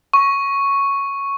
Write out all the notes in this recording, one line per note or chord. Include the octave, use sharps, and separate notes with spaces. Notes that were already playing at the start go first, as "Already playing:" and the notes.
C#6